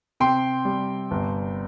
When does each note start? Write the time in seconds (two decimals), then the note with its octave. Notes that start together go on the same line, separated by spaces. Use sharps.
0.20 C3 G5 C6
0.65 G3
1.11 G1